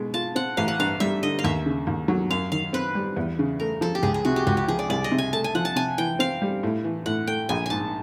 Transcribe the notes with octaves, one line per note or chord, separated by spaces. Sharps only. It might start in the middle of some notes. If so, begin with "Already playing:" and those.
Already playing: B2 G#3
F4 A5
C4 F#5
A1 F5
F#5
G2 F5
G3 E5
D3 D#5
F5
D#2 E5
C#3
D#2
F#3
F#2 F5
D#3 F5
C4 B4
G3
E2
C#3
A3 A#4
F3 A4
G4
C#2 G#4
G#4
C3 F#4
G4
C#2 F#4
G4
F3 G#4
D5
C2 D5
D#5
C3
G#5
A3 A5
G#5
F3 F#5
A5
C3 G#5
E3 G5
C4 F5
G3
A2
E3
A2 F#5
A3 G5
A#1 G#5
G#2 G#5 A5